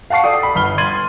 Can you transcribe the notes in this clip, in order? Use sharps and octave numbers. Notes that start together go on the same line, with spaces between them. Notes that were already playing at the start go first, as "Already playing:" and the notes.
F5 F#5 A5 C#6 C7
A4 D5 G5 D#6
B5
G1 B5 F6 G7
C6 G#6 A6 D#7 F#7